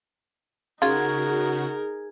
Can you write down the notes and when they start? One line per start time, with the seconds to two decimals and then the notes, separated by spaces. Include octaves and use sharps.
0.82 C#3 D#4 F4 F#4 G#4 A#4